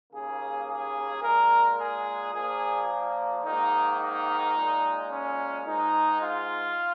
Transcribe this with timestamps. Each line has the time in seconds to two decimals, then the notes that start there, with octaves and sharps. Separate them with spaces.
0.12 D#2 C#3 A#3 G#4
0.67 G#4
1.22 A#2 G#3 A#4
1.78 G#4
2.33 A#2 F3 A#3 G#4
3.43 G#2 D#3 A#3 D#4
4.00 D#4
4.55 A#2 G#3
5.09 C#4
5.66 G#2 G#3 D#4
6.21 F4